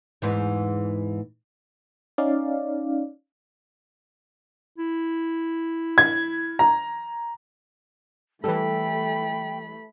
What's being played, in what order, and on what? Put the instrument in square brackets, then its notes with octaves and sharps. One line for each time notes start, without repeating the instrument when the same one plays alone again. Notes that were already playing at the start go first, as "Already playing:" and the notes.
[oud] E2 G#2 E3
[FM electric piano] C#4 D#4 D5 F5
[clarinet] E4
[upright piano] G#6
A#5
[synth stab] E3 G3 [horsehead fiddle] A3 B5 [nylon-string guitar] A4 [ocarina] G5